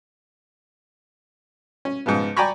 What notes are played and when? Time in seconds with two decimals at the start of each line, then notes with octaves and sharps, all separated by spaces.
1.85 C#4
2.06 G#2 C#3 F3 B3
2.37 D5 G5 G#5 A#5 B5 C#6